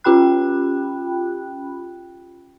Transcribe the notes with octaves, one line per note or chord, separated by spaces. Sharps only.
C#4 F4 G4 G5 B5 F#6